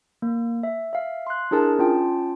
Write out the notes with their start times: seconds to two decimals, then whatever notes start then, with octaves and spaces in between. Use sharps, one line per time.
0.22 A#3
0.63 E5
0.93 E5 F5
1.27 C6 F#6
1.51 D4 E4 G#4 A#4 A5
1.79 C#4 F4 G5 A5